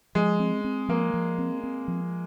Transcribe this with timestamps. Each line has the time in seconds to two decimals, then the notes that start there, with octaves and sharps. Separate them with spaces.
0.15 F3 G#3
0.40 C4
0.64 C4
0.89 F3 A#3
1.14 F3
1.38 C4
1.63 C4
1.88 F3